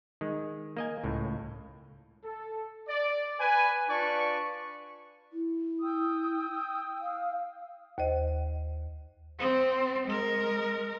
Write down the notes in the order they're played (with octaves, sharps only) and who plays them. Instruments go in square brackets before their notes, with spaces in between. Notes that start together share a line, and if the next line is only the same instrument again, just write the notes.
[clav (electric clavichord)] D#3 G#3
A#3 D#5 G#5
C#2 A2
[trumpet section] A4
D5
B4 G#5
D4 F4 B4 D5 A5 C#6
[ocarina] E4
[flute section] G5 D#6 E6
[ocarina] F5
[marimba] D#2 C5 D#5
[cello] C4
G#3 A#4